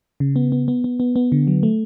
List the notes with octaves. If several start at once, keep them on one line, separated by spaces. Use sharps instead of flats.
C#3
B3
B3
B3
B3
B3
B3
D3
F#3
A3